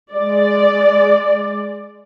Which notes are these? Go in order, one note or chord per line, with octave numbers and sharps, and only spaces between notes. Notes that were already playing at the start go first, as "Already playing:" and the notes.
G#3 D5